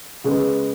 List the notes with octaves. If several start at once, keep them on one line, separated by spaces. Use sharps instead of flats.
C#3 G#3 B3